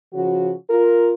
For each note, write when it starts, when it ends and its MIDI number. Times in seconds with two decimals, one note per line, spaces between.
0.13 0.52 49
0.13 0.52 53
0.13 0.52 66
0.69 1.13 65
0.69 1.13 70